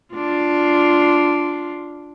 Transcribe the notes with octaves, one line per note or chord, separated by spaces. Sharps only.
D4 F4